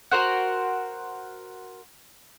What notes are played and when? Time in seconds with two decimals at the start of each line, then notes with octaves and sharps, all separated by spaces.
0.12 F#4 A#4 C5 F#5